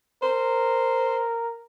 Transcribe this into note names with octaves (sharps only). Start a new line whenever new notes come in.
A#4 C5